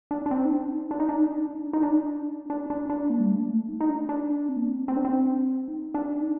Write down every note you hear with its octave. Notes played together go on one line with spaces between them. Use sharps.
D4
D4
C4
D#4
D4
D#4
D4
D#4
D4
D#4
D4
D#4
D4
D#4
D4
D#4
D4
D#4
D4
D4
D4
D4
A#3
G3
A3
A#3
A3
D#4
D#4
D4
D4
C4
A#3
C4
C4
D4
C4
D#4
D4
D#4